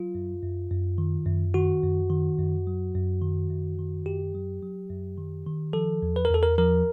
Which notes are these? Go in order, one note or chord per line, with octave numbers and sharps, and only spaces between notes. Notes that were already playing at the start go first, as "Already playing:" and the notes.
Already playing: F#3 F4
F#2
F#2
F#2
D#3
F#2
D#3 F#4
F#2
D#3
F#2
F#3
F#2
D#3
F#2
D#3
F#2 G4
F#3
F#3
F#2
D#3
D#3
F3 A4
E2
B4
A#4
E2 A4
A#4
F3 A#4